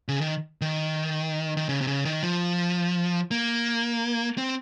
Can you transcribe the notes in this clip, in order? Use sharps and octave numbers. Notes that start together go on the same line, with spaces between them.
C#3
D#3
D#3
D#3
C#3
C3
C#3
D#3
F3
A#3
C4